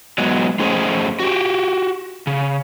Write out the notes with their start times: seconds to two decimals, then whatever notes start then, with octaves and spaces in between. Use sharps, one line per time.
0.18 F#3 G#3 B3
0.59 F2 A3 C#4 G#4 C5 D#5
1.19 F#4 G4
2.27 C#3